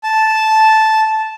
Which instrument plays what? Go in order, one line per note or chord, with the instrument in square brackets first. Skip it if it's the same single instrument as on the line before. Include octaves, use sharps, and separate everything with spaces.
[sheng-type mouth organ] A5